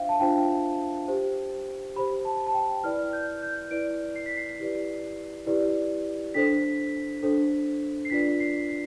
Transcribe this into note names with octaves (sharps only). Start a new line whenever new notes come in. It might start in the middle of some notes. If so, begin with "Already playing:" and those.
Already playing: D4 F4 C5 E5 F5 G5
A5
D4 F4 C5 G5
G4 C5
G4 C5 B5
A5
A5
G5
E4 B4 D5 F6
G6
G6
E4 B4 D5 D7
C7
B6
C7
E4 G4 B4 D5
E4 G4 B4 D5
D4 A4 C5 B6
D4 A4 C5
C7
D4 F4 B4 D5 B6
C7
C7